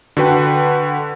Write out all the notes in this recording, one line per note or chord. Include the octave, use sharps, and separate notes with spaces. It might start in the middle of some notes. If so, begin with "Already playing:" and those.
D3 F#4 B4 G5